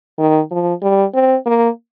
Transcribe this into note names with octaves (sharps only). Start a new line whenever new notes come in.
D#3
F3
G3
C4
A#3